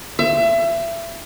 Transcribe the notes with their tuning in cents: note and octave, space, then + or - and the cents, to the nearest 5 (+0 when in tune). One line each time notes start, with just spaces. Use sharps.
E5 +30